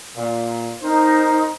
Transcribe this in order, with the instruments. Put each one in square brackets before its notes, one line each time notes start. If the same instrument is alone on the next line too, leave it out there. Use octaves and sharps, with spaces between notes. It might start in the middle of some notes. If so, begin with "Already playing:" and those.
[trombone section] A#2
[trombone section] C4 A#4 C5 [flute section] D#4